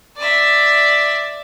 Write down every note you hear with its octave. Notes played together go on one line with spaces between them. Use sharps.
D5 E5